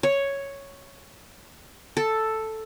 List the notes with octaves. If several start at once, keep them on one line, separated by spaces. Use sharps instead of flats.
C#5
A4